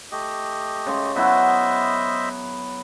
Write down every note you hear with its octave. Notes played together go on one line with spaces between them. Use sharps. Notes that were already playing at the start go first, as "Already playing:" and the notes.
A3 G4 D#5
C#3 G#3
F#3 B3 E4 C5 D#5 E5